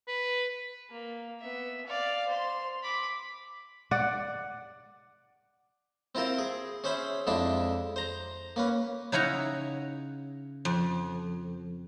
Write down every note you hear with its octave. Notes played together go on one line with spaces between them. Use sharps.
B4
A#3
B3 E5
D5 F5
C5 C6
B5 D6
D5 F#5
C4 E4 F4 A#4 C5
G#4
C#4 G#4 C5 E5 B5
F2 G#3 D4 E4 E5
C5 A#5
A#3 C#4 B4
C#3 D#4 E4 C#5 F#5 A#5
F2